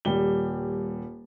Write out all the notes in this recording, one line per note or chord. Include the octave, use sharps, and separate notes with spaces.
D#1 G3 G7